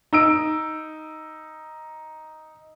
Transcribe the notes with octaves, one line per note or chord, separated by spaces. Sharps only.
D#4 E6 D7